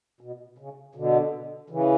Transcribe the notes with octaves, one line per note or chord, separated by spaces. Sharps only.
B2
C#3
B2 D3
C#3 E3